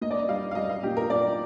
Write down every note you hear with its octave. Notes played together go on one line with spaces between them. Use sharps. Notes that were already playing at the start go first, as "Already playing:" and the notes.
A#3 D#5
D5
D#5
G3 F5
F5
G3 D#5
F5
A#2 G4
A#4
A#2 D5